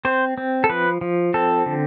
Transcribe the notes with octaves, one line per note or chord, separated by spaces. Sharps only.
C4 C5
C4
A4
F3 B4
F3
C4 A4
D3